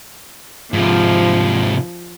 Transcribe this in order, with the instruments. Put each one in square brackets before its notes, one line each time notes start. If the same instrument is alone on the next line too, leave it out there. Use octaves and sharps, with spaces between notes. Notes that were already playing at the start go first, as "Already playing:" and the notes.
[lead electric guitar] G#2 C3 [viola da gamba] F3